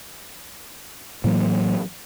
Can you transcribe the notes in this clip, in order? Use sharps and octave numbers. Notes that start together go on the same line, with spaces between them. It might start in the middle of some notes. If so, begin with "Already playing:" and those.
A2 E3 F#3 A#3